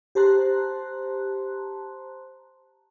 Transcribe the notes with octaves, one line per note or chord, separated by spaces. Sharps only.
G4 C5 A5 A#5 C6 F#6